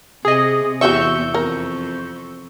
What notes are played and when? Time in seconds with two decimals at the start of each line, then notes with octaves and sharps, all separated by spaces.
0.25 C3 G#4 D#5
0.81 E2 F#4 G4 E5 C#6 E6 G6
1.34 F2 A#4